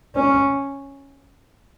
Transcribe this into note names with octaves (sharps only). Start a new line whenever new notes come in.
C#4